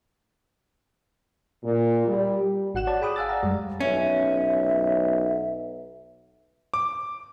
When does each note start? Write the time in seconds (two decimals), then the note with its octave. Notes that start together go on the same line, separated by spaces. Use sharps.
1.64 A#2
2.07 G3
2.75 G#1 F#4 F#5 F#6 E7
2.87 F#4 C#5 D5 A5
3.01 G#4 G5 B5 D6 D#6 F#6
3.16 F5 F#5 G#5 E6 A6
3.29 D5 F5 A#5
3.43 F#2 G3 G#3
3.80 B1 C#4 E5
6.74 D6